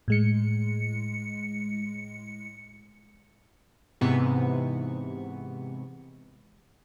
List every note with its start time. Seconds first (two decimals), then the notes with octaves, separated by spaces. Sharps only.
0.08 A2 G#3 C#7
4.01 G#2 C3 E3 B3 C#6